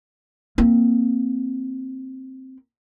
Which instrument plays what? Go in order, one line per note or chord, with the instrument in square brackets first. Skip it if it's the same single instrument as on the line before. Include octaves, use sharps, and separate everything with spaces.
[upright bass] A#3 C4